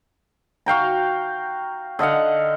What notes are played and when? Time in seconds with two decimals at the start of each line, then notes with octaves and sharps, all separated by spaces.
0.66 F#4 F5 G5 A#5
1.99 D3 D#5 F5 F#5